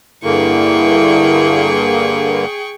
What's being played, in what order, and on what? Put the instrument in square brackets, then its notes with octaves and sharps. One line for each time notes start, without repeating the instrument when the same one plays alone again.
[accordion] G2 D3 A#3 [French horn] E4 [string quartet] G#4 G5 C#6